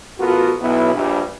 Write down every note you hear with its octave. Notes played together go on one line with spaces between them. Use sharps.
A1 B3 F4 F#4 A4 A#4
B1 B3 E4
A#1 G2